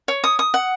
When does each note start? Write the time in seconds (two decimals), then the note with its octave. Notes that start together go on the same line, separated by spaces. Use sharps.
0.08 C#5
0.24 D#6
0.39 D#6
0.54 F#5